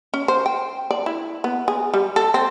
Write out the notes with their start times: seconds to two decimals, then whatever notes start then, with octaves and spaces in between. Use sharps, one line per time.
0.14 C#4
0.28 C5
0.46 G5
0.91 D5
1.06 E4
1.44 B3
1.68 G#4
1.94 G3
2.16 A4
2.34 C4